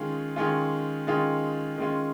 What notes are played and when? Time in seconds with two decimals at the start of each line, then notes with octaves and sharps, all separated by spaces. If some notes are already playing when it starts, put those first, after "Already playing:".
Already playing: D#3 G#3 C#4 F4
0.36 D#3 G#3 C#4 F4
1.07 D#3 G#3 C#4 F4
1.78 D#3 G#3 C#4 F4